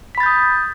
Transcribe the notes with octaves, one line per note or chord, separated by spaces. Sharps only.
B5 D#6 G6 A6 B6